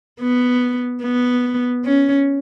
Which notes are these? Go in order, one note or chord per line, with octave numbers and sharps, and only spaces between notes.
B3
B3
C#4